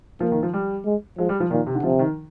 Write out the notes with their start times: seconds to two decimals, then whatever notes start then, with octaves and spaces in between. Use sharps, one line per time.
0.20 F3 A#3
0.31 D#3
0.43 F3
0.53 G3
0.86 G#3
1.18 F3 G#3
1.29 G3
1.40 F3
1.51 A#2 D#3
1.67 C3
1.75 D3
1.83 C3 F3
1.99 D#3